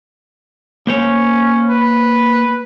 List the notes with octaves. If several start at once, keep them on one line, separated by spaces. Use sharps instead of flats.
A#3 C#4 C5 C#5
B4